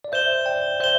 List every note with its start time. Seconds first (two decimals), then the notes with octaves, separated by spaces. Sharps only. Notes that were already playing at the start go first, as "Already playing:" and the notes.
0.04 D5
0.12 C5 E5 G6 E7 G7
0.46 D5 G5
0.80 C5 E5 G6 E7 G7